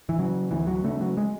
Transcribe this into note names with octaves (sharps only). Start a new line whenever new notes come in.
E3
C#3 F#3
D2 E3
F#3
C#3 A3
F#3
G#3